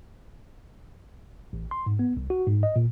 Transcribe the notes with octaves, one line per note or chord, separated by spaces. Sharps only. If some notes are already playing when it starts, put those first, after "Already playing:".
A1
C6
G#2
B3
C2
F#4
G#2
D#5
A#2